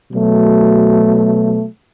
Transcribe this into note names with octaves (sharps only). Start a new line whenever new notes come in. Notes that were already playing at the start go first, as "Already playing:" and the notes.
B2 F#3 A3